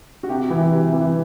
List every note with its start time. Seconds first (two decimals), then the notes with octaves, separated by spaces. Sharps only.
0.23 F#4
0.29 C3 G4
0.50 E3
0.71 C3
0.92 E3